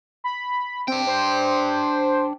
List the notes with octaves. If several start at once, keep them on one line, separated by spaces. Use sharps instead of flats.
B5
C4 D4 G5
C5